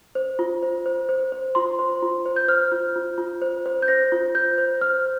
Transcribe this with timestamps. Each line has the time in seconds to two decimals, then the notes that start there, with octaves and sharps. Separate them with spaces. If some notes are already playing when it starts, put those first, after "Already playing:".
0.15 C5
0.39 F4
0.63 C5
0.86 C5
1.09 C5
1.32 C5
1.55 F4 C6
1.79 C5
2.02 F4
2.26 C5
2.36 G6
2.48 C5 F6
2.72 F4
2.96 F4
3.18 F4
3.42 C5
3.66 C5
3.82 G6
3.88 C5 A#6
4.12 F4
4.35 C5 G6
4.58 C5
4.81 C5 F6